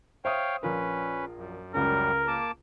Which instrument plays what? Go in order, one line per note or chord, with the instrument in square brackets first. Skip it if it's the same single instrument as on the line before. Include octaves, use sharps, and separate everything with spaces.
[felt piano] C5 E5 D#6 [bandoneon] C#5 F5 G5
[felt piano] A#1 F4 A#4 [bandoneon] C#4 B4
[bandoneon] F#2
[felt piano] C#2 C#3 C#4 [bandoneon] F#2 G3 [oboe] A#4
[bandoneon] A#3 A5 D6